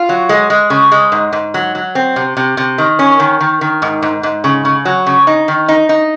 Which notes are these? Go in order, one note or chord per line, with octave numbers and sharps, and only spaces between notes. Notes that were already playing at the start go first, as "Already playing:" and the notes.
Already playing: F4
F#3
G#3
G#3
C#3
G#3
G#2
G#2
F#3
F#3
C4
C3
C3
C3
D#3
C#4
D#3
D#3
D#3
G#2
G#2
G#2
C#3
C#3
F#3
C#3
D#4
D#3
D#4
D#4